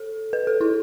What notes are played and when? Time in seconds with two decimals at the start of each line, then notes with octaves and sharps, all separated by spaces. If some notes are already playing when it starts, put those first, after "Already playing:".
Already playing: A4
0.33 B4
0.47 A4
0.61 E4